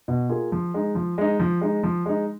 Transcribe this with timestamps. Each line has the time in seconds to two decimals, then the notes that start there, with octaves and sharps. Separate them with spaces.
0.08 B2
0.29 A#3 F4 G#4
0.52 F3
0.74 G#3 D#4
0.95 F3
1.18 G#3 D#4
1.40 F3
1.61 G#3 D#4
1.83 F3
2.06 G#3 D#4